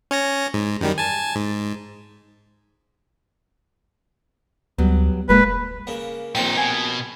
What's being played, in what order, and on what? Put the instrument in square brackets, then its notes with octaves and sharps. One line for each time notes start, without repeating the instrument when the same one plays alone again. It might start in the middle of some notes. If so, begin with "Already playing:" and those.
[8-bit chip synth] C#4 C#5 A#6
G#2
F#2 D#3 G3
G#5 A5
G#2
[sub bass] D2 [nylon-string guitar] F#3 G3 B3
[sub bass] F1 [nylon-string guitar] A#2 G#3 A#3 [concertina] B4
[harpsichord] C#3 A#3
[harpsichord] A#1 C4 G5 [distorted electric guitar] A#2 D#4
[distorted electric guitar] B2 [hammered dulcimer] G#5